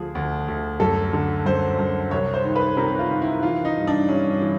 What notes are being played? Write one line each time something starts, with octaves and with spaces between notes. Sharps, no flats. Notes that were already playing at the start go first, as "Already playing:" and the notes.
Already playing: D2 F3 G#4
D2
D2
F#2 A4
D3
F#2 C5
F#2
C2 C#5
C5
D#3
B4
C3 A#4
F4
D#3
E4
E3 F4
D#4
G2
D4
G2 C#4
E3